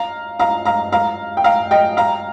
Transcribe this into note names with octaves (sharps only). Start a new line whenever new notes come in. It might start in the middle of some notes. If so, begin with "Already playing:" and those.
Already playing: F5 A#5
F5 A#5
F5 A#5
F5 A#5
G5
F5 A#5
D#5 G5
F5 A#5